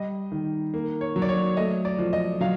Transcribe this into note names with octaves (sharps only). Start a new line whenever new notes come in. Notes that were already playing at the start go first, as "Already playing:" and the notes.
Already playing: G3 D#5
D#3
A#3
C#5
F#3
D5
C#5
A3 D#5
D5
F3
D#5
F#3 F5